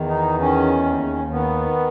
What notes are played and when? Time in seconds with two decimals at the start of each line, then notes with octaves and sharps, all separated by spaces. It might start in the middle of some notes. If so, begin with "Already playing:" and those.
Already playing: E2 D#3
0.08 D#4
0.40 D#3 C#4
0.86 D#2
1.31 D#3 B3